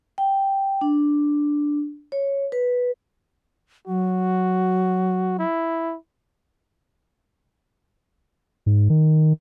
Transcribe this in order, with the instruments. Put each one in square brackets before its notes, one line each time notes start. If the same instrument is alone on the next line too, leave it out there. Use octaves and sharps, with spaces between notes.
[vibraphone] G5
D4
C#5
B4
[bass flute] F#3 [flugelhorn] F#4
[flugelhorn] E4
[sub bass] G#2
D#3